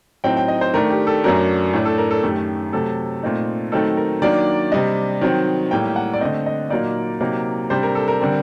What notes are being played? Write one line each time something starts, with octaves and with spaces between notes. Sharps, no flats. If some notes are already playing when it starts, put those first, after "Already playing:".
A2 F#3 C4 D#4 G5
G5
D#5
C5
D#3 A3 D4 A#4
G4
A4
F#2 F#3 A3 D4 A#4
A2 A3 D4
A4
A#4
A4
F#2 D#3 A3 G4
C3 F#3 A3 A4
A#2 A3 C4 D#4
D#3 F#3 A3 C4 D#4 A4
A#4
D#3 F#3 A#3 D4 D5
C3 G3 D4 D#5
D#3 F#3 C4
A2 G3 A#3 G5
F#5
D5
D3 A3 C4 D#5
D#5
A#2 F#3 A#3 D#4 D5
C3 F#3 A#3 D#4
C3 G3 D4 C5
A#4
A4
A#4
D3 G3 C4